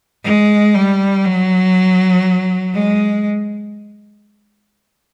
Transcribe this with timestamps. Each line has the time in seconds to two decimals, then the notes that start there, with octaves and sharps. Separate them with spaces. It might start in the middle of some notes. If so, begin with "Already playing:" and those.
0.24 G#3
0.75 G3
1.25 F#3
2.74 G#3